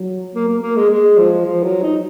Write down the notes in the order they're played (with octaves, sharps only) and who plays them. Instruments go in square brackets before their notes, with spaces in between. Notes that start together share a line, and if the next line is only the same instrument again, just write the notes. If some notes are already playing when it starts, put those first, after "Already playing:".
Already playing: [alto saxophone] F#3
A#3
A#3
A#3
G#3
G#3
F3
F3
F#3
D#4